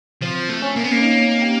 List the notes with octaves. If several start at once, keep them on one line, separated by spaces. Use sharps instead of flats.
F3 C4
A3
C#4
A#3
B3
A#3
D#4
G4